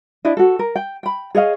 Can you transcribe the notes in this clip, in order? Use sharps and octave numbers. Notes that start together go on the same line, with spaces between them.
D4 E4 D#5
F#4 A4
A#4
G5
G5 B5
G#4 C#5 D#5 F5